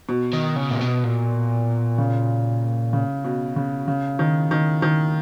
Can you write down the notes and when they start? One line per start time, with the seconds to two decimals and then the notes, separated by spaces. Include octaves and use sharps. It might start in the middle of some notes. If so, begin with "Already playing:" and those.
0.09 B2
0.33 D#3
0.56 C#3
0.71 A#2
0.81 B2
1.04 A#2
1.98 C#3
2.93 C#3
3.24 B2
3.56 C#3
3.88 C#3
4.19 D#3
4.51 D#3
4.82 D#3